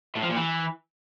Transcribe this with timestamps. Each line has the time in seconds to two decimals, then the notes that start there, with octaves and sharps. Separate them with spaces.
0.16 A2
0.23 F3
0.29 A#2
0.36 E3